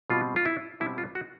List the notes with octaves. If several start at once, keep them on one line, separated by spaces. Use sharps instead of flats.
B2 G3 C4 F4
F4
E4
B2 G3 C4 E4
F4
F#4